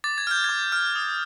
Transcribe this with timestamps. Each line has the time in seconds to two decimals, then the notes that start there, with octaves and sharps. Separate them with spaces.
0.04 D6 A6
0.18 G#6
0.27 F6 G6
0.44 D6 G#6
0.72 F6
0.96 D#6